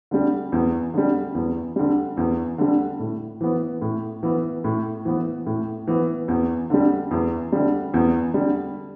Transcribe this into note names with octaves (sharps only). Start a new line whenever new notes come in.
D3 G3
E2
D3 G3
E2
D3 G3
E2
D3 G3
A2
E3 B3
A2
E3 B3
A2
E3 B3
A2
E3 B3
E2
D3 G3
E2
D3 G3
E2
D3 G3